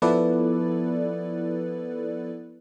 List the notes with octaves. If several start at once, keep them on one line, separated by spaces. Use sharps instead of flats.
F3 B3 E4 A4 B4 D5